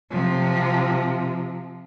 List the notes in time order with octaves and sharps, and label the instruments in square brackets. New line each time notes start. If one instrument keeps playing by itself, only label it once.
[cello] C3 F3